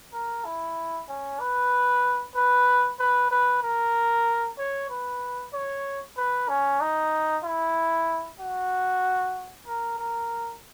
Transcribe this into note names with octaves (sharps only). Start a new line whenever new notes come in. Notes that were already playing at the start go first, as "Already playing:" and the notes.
A#4
E4
C#4
B4
B4
B4
B4
A#4
C#5
B4
C#5
B4
C#4
D#4
E4
F#4
A#4
A#4